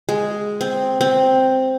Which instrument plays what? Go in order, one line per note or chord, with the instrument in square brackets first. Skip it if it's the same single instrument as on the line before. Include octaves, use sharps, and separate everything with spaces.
[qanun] G#3
C4
C4